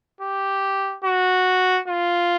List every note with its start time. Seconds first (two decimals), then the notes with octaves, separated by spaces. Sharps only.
0.21 G4
1.05 F#4
1.88 F4